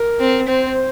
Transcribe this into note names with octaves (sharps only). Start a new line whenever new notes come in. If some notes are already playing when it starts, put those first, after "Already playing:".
Already playing: A#4
C4
C4 C5